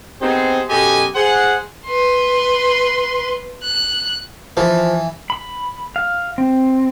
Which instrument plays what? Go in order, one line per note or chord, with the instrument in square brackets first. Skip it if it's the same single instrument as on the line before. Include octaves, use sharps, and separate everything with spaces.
[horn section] B3 C4 D#4 G4 G#4 C5
F#2 B2 G4 A4 D#5 G#5
G#4 C5 F#5
[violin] B4 C6
F#6
[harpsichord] E3 [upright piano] F3
[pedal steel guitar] B5
F5
C4